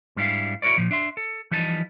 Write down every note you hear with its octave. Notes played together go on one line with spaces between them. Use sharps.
G#2 G3 D4 E4 F5
E4 F#4 A#4 C#5 D5
A#2 F3
D4 E5 C6
A4
E3 F3 G3 D#4 A5